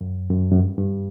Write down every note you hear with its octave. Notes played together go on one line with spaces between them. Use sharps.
F#2
F#2
F#2
G2
G2